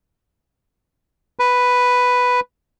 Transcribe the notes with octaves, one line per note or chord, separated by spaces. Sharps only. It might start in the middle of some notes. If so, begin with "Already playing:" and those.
B4